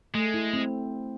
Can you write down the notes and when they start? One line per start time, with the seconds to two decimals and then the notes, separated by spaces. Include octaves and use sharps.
0.15 G#3 A3
0.34 E4
0.54 C4